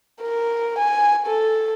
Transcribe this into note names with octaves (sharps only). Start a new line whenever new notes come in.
A#4
G#5
A4